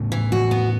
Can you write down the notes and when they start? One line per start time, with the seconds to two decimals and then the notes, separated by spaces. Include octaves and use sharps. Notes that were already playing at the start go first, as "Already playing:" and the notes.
Already playing: A2 C#3
0.12 E3
0.32 F#4
0.51 B3